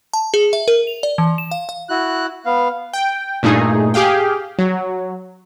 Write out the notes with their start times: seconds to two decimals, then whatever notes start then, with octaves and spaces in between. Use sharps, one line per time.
0.13 A5
0.34 G#4
0.53 E5
0.68 A#4
0.87 F7
1.03 D5
1.18 E3
1.38 E7
1.51 F5
1.69 F5
1.89 E4 F#4 F#6
2.46 B3 F5
2.93 G5
3.43 G2 A#2 A3 D#4 G#4
3.94 G4 G#4 F5 G5
4.59 F#3